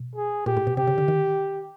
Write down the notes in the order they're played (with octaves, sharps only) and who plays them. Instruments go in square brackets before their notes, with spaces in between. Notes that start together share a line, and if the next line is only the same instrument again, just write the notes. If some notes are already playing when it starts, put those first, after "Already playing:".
Already playing: [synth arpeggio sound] B2
[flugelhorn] G#4
[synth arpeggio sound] A#2 [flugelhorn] G4
[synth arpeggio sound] A2
B2
[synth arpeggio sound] C3 [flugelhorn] G4
[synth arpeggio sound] C#3
D3
D#3